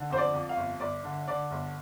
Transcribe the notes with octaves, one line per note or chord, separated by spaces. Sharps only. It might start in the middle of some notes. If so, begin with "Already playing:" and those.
Already playing: D3
F2 C5
D5
F2
F5
G1
G1 D5
D3
D3 D5
G1